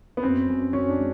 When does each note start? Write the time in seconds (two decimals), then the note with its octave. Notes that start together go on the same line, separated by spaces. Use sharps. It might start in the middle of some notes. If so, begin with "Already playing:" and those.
0.17 B3
0.23 F#2 C4
0.48 F#2
0.73 F#2 C#4
0.89 D4
0.98 G#3